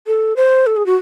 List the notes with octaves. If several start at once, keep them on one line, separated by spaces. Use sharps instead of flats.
A4
C5
A4
G#4
F#4